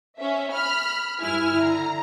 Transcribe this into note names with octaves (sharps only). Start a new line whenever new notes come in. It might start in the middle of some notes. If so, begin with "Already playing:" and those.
C#4 E5
B5 F6
G2 E4 G#5 F6
D3 A#5